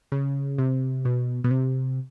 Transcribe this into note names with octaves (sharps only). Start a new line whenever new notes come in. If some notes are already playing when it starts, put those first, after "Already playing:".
C#3
C3
B2
B2
C3